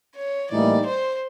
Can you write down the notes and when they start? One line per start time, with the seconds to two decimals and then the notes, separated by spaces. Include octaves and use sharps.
0.16 C#5
0.50 A2 E3 G3 A#3 D#4 D5
0.86 C5